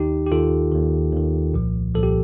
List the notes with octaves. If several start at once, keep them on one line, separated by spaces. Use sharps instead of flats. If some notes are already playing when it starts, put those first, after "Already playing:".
Already playing: D#2 D#3 D#4 G4
G4
D#2 D#3 F4 A4
D#2 D#3
D#2 D#3
C2 A#2 F3
C2 A#2 F3 A4
G4